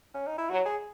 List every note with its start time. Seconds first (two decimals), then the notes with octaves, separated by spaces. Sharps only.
0.14 C#4
0.27 D#4
0.38 E4
0.50 F#3 F#4
0.66 G#4